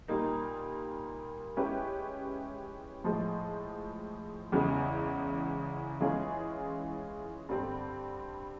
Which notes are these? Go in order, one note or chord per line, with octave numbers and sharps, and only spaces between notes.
A#2 G3 A#3 D#4
G#3 C#4 E4 G4 B4
A2 F3 G#3
E2 C#3 E3 G#3
E3 G#3 C#4 F4 G#4
G2 D3 G3 C4